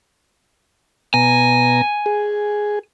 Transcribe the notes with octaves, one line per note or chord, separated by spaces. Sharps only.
B2 G#5 A#5
G#4